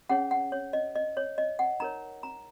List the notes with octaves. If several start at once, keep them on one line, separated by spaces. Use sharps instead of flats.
C#4 G#4 C#5 F#5
F#5
C#5
D#5
D#5
C#5
D#5
F#5
D#4 A#4 C#5 A#5
A#5